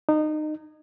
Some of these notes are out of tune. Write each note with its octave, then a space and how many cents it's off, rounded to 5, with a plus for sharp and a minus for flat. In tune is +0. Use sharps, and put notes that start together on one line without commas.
D#4 -25